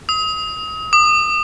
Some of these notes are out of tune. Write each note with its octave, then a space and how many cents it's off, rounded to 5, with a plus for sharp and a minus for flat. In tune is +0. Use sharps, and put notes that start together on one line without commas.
D#6 +35
D#6 -40